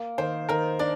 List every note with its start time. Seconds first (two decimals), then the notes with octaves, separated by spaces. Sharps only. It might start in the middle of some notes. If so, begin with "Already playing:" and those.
Already playing: A#3
0.18 D#3 C5
0.49 D#3 A#4
0.79 D4 D5